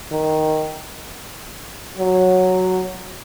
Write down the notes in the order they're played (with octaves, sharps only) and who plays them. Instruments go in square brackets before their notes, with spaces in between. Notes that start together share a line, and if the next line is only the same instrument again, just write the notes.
[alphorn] D#3
F#3